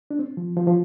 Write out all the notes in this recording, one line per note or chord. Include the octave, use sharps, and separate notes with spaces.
D4
C4
F3
F3
F3